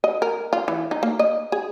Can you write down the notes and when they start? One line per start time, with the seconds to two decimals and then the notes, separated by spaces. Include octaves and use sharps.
0.04 D#5
0.22 A#4
0.53 F4
0.68 E3
0.91 D#4
1.03 A#3
1.19 D#5
1.52 G#4